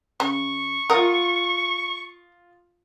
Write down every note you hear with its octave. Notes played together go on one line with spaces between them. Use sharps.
C#3 C#6
F4 A#4 F#5 D#6